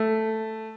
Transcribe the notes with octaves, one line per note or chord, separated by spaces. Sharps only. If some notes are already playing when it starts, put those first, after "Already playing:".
Already playing: A3